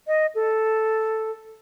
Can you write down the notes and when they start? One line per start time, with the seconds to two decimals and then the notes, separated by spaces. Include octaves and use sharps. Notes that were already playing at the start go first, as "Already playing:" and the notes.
0.07 D#5
0.35 A4